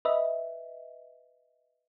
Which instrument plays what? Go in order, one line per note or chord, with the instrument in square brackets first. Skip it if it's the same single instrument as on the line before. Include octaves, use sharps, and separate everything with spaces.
[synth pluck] B4 D#5 E5